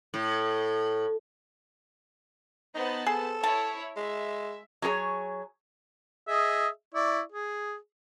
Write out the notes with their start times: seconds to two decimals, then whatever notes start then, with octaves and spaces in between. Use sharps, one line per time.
0.14 A2
2.75 B3 D#4 C5 A5
3.06 G#4 A4
3.43 E4 C#5 A5
3.96 G#3 E5
4.82 F#3 G#4 A4 C#5
6.28 G#4 D#5 E5
6.94 E4 D5 C#6
7.32 G#4